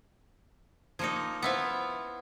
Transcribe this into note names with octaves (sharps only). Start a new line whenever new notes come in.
F3 A#3 D#4 G#6 C#7
B3 E4 F4 C5 E5 F#5